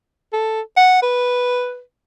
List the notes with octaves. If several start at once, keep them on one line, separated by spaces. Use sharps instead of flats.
A4
F#5
B4